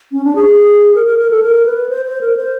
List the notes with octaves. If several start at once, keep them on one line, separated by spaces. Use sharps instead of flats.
C#4
D4
G#4
A#4
A#4
A#4
A4
A#4
B4
C5
C5
A#4
C5